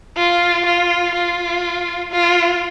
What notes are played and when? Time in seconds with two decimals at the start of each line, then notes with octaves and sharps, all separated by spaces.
0.16 F4
0.65 F4
1.14 F4
2.12 F4